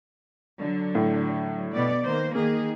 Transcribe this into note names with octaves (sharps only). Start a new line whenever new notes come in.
D3 F#3
A2
B2 B3 D5
D#3 A#3 C5
D#3 A#3 G#4